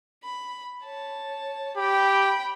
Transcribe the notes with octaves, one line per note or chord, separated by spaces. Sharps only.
B5
C#5 A5
G4 G5 B5